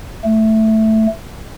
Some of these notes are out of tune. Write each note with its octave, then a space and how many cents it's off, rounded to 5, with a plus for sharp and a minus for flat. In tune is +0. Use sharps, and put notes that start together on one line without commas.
A3 +0